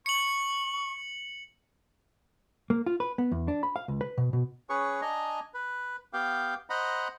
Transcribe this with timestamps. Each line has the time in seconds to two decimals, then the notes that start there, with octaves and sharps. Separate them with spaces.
0.06 C#6 C#7 F#7
2.70 A#3
2.86 F4
3.00 B4
3.18 B3
3.32 E2
3.48 D4
3.63 B5
3.76 F5
3.88 C#2
4.01 B4
4.18 B2
4.33 B2
4.70 C#4 G#4 B4 C#5 C#6
5.02 D4 D#5 G#5 A#5
5.54 B4
6.13 B3 G4 F5 G5
6.70 C5 D#5 F#5 A#5 B5